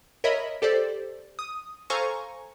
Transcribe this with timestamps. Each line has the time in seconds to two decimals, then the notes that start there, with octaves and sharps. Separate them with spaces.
0.24 A#4 C#5 D#5 E5 B5
0.62 G4 A4 C5 D5
1.39 D#6
1.90 A4 C5 F5 G#5 A#5 C#6